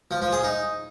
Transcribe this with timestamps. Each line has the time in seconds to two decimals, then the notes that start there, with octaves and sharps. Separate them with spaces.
0.11 F3
0.22 F3
0.33 G#4
0.43 D#4